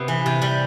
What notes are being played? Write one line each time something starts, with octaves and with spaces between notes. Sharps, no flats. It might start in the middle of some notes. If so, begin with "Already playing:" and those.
Already playing: C3 B3
E3
C3
G3